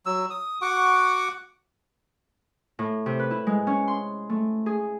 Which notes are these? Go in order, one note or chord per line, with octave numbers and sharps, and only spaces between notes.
F#3 E6
D#6
F#4 F#5 C#6 D6
A2
C3
B4
E4
G#3
C#4
C6
A3
G#4